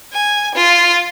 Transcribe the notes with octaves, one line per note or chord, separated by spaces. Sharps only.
G#5
F4